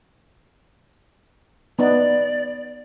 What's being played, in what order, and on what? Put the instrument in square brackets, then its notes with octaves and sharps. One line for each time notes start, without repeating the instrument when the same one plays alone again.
[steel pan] B3 D#4 [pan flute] D5